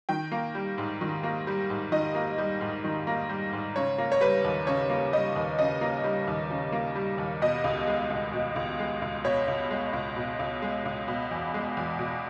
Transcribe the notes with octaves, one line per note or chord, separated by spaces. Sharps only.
D#3 G5
A#3
G3
G#2
D#3
A#3
G3
G#2
D#3 D#5
A#3
G3
G#2
D#3
A#3
G3
G#2
C#3 C#5
A#3
C#5
G3 B4
D#2
C#3 C#5
A#3
G3 D#5
D#2
C#3 D#5
A#3
G3
D#2
C#3
A#3
G3
D#2
B2 D#5
C#2
G#3
C#2
B2
C#2
G#3
C#2
B2 C#5
C#2
G#3
C#2
B2
C#2
G#3
C#2
B2
E2
G#3
E2
B2